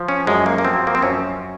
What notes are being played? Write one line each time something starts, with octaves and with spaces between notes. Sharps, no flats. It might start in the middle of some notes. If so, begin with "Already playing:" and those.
Already playing: F3
C#4
F#2 G#3
A#3
A#3
F3 C4
A#3
C4
F#2 C#4